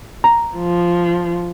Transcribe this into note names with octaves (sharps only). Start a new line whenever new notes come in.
A#5
F3